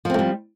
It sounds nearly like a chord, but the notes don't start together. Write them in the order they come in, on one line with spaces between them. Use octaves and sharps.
F3 C4 A3 G3